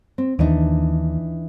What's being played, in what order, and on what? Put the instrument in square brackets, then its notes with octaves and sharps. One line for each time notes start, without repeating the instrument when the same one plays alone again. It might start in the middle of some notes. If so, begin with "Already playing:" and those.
[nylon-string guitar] C4
[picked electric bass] D#2 [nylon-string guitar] E3 D4 D#4